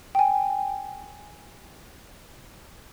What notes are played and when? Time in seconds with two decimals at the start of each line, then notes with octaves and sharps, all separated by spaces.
0.15 G5 G#5